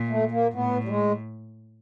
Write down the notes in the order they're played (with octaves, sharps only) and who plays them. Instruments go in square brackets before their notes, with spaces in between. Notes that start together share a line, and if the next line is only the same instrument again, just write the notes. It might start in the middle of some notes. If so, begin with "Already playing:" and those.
Already playing: [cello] A#2
[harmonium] A3
A#3
[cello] A2 [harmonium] B3
[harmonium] G3
G#3